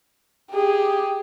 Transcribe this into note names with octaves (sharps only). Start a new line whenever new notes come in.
G4 G#4